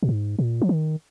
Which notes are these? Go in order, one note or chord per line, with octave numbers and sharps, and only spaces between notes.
A#2
G#2
A#2
F3
D#3